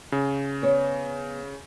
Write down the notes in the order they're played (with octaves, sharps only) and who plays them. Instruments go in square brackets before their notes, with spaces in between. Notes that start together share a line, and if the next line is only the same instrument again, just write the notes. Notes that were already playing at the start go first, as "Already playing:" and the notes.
[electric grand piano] C#3
[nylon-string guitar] B3 C#5 D5